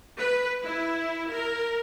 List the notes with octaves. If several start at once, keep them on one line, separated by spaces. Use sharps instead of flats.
B4
E4
A#4